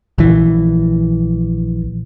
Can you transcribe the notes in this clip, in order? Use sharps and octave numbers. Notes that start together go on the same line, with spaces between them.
A#1 E3